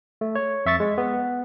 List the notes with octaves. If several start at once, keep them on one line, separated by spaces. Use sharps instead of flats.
A3
C#5
F2 E5 C#6 A6
G#3
B3